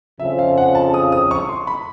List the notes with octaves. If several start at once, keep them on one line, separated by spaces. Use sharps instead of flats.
F2 C#3 F3 E5
F5
F#5
A5
D#6
D#6
C#6
C6
B5